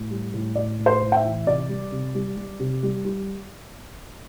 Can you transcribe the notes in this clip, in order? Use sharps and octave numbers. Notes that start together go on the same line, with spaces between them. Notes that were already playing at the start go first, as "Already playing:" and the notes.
Already playing: A2
G3
A2
A2 D5
A2
C5
A2
G5
E5
E3
C3 D5
G3
C3
G3
G3
C3
G3
G3